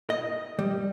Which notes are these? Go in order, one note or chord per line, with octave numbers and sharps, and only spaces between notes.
D#5
G3